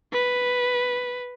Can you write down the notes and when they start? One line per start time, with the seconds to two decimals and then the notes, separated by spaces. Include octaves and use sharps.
0.12 B4